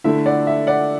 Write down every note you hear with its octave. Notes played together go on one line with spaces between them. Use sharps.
D3 A3 E4 E5
D5 F#5
E5
D5 F#5